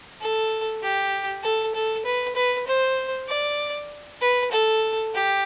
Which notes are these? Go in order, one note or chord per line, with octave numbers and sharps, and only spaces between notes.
A4
G4
A4
A4
B4
B4
C5
D5
B4
A4
G4